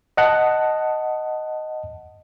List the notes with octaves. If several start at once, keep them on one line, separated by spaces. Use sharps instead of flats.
D#5 F#5 A5